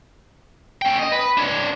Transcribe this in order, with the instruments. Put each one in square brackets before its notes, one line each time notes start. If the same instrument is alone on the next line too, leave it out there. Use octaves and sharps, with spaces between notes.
[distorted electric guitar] C#4 G5
D#5
B4
D4 C#5